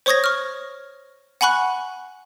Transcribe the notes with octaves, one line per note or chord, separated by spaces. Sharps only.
C5 C#5 C#6 D#6 G#6 A#6
C#6 F6
F#5 G#5 B5 C#6 F#6